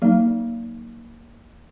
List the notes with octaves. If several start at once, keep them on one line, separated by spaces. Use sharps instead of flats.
F#3 A#3 D#4